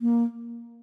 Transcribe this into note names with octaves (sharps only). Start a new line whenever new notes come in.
A#3